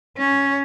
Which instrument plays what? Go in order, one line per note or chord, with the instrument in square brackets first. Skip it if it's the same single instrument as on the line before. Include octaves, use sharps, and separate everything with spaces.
[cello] C#4